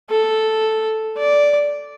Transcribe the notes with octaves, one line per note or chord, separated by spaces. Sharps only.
A4
D5